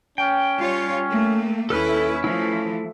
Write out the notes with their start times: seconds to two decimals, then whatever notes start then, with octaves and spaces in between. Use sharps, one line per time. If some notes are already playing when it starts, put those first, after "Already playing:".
0.18 C#4 G5
0.59 G3 F4 C#5
1.10 A3 A#3
1.70 D#2 C#4 E4 A4 B4 F6
2.24 E3 F3 A3 E4